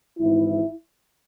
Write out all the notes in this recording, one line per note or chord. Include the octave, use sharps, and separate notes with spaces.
G#1 G#2 E3 E4